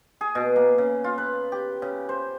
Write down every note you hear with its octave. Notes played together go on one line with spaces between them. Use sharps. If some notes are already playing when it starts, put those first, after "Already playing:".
G#4
B2
A#3
C#3
F4
B4
G4
C#3
C5